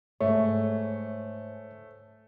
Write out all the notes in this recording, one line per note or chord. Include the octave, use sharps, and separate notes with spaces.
G#2 A3 C#5